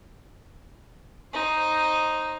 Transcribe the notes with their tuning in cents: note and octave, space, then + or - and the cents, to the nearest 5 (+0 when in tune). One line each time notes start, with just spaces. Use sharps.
D#4 +0 C5 +20